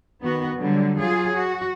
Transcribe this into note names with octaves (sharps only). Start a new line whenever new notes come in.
D#3 B3 F#4
D3 F#3 G3
F#3 F4 G#4
F#4